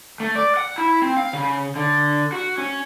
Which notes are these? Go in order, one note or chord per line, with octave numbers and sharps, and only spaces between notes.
A3
D5
F#5
E4
C4
F5
C#3
D3
F#4
C#4